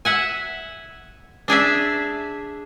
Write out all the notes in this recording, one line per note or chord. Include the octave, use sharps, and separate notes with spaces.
E5 F#5 G#5
D4 G#4 D5 E5